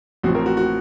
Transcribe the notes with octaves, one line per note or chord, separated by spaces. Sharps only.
A1 A2 F3 C4 F#4
A#4
F#4
F#4